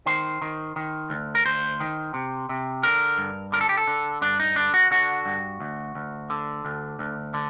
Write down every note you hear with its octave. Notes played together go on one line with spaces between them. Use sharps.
D#3 C5
D#3
D#3
D2
A#4
D2 C5
D#3
C3
C3
D3 A#4
G2
D3 A#4
A4
G4
A4
D3
G2 D4
D#4
D3 D4
F#4
D3 F#4
G2
D2
D2
D3
D2
D2
D3